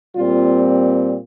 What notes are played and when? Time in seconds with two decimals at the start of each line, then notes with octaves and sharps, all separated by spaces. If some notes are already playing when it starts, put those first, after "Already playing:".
0.15 A#2 G3 C4 F4